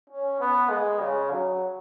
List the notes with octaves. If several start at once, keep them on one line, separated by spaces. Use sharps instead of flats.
C#4
B3
G#3
C#3
F#3